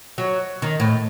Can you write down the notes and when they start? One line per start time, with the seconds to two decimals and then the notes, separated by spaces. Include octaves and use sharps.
0.18 F#3
0.62 D#3
0.80 A2